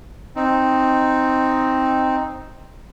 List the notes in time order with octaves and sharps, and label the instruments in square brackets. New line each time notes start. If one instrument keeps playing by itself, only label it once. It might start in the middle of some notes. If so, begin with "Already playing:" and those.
[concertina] C4 D#4